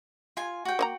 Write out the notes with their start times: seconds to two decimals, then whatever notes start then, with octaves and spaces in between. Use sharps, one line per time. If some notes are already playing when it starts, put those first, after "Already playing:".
0.37 F4 G#5
0.65 F#4 G5
0.79 A#3 D#5 A#5